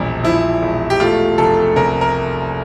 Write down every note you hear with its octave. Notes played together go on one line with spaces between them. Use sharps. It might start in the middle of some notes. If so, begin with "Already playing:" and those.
Already playing: E1 A#1 G3
F3 E4
E1
G4
A3 F4
F1 A4
C2 A#4
A#4